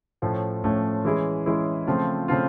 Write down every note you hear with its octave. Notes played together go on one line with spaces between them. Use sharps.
A2 F3 A3 C#4
A2 F3 A3 C#4
E3 G#3 C#4 E4 G#4
E3 G#3 C#4 E4 G#4
C#3 F3 A3 C4 F4
C#3 F3 A3 C4 F4